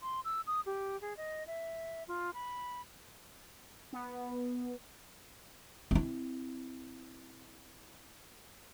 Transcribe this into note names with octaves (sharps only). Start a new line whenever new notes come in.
C6
E6
D#6
G4
G#4
D#5
E5
F4
B5
B3
C4 E4